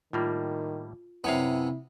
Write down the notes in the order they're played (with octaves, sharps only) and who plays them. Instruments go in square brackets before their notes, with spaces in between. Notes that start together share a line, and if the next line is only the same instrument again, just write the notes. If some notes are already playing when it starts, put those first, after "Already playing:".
[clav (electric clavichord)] A2 G3 A#3 [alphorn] D#3 [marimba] F4
[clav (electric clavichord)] F#2 C#5 F5 [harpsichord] C3 B3 [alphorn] E4